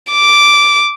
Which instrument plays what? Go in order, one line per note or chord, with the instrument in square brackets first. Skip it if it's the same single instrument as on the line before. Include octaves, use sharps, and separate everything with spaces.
[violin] D6